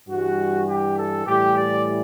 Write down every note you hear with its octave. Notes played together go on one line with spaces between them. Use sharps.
G2 E3 G3 F#4
G4
A4
A2 E3 G3 G4
D5